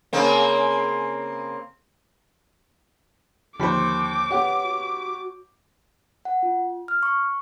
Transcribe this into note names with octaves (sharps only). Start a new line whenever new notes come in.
C#3 A#3 C4
D#2 D3 F3 C5 B5 D6
B3 G4 C#5 F#5
F#4
F#5
F4
F6
C#6